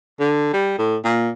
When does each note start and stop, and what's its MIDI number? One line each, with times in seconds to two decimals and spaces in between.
0.20 0.48 50
0.53 0.75 55
0.79 0.96 45
1.05 1.29 46